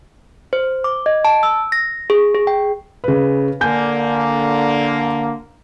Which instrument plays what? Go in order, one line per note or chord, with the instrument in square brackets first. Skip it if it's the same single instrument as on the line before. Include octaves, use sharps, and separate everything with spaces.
[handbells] C5
D6
D#5
A5
E6
A#6
G#4
G#4
G5
[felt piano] C#3 B4
[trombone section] D3 A#3 [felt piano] G#5 G6